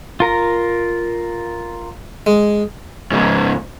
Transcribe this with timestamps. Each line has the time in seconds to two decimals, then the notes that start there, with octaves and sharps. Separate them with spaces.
0.20 F4 A#4 A#5
2.26 G#3
3.11 G#2 C#3